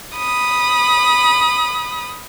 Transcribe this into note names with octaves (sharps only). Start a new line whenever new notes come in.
B5 D#6